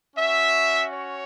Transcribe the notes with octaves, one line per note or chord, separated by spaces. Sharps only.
C#4 F#4 E5
C#5